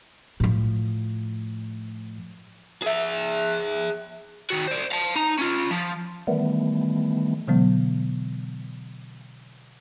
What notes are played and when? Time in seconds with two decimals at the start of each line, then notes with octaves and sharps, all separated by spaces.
0.40 A2 F3
2.82 G#4 E5
4.50 D#3 F#4
4.67 C5 D5
4.92 F5 A5
5.15 D#4 A#5
5.39 C#4 F4
5.71 F3
6.27 D#3 E3 G3 A3 B3
7.47 B2 D3 E3 F#3 G#3 B3